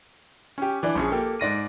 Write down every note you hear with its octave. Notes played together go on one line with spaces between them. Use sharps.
C#4 G4
E3 D4 D5
A#1 C#4 G#4
A#3 G4 A4
G#2 D5 A#6 D#7